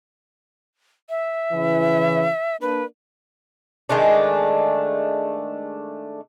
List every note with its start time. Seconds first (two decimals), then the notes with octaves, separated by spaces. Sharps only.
1.09 E5
1.53 C#3 E3
2.61 A#3 D4 B4
3.89 D#3 G#3 A3 D4